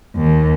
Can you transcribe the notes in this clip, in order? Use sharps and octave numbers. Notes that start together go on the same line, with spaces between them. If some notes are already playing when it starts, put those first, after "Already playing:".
D#2